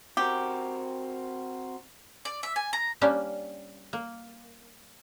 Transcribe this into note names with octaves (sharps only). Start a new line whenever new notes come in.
C4 F#4 G4 A#4
D5
E5
G#5
A#5
G3 A#3 C#4 D4 G4
A#3